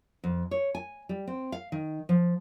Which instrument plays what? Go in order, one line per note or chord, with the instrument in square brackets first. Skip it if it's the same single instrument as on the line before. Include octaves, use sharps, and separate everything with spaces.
[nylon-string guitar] F2
C#5
G#5
G3
C4
F5
D#3
F3